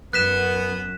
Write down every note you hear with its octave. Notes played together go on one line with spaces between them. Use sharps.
F#2 B3 F#6 B6 E7